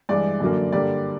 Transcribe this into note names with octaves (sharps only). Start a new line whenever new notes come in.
G2 E3 G#3 D5
F#2 D3 F#3 A#3
G2 D3 G3 A#3 D5